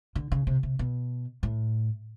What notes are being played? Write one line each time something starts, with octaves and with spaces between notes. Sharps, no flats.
D3
C#3
C3
C3
B2
A2